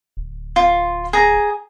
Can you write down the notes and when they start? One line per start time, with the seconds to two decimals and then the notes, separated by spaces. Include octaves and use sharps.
0.17 D1
0.56 F4
1.13 G#4 A#5